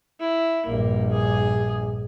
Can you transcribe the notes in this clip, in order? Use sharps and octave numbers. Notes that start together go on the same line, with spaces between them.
E4
A#1 G2 A#3
G#4